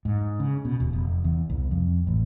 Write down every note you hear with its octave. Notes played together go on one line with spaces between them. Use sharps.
G#2
C#3
B2
D#1
F1
E2
C2
F2
A1